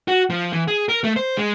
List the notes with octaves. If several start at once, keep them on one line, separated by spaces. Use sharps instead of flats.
F#4
F3
E3
G#4
A#4
A3
C5
G#3